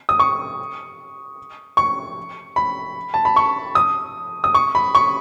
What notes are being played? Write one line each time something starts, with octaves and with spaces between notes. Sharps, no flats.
D#6
C#6
C#6
B5
A5
B5
C#6
D#6
D#6
C#6
B5
C#6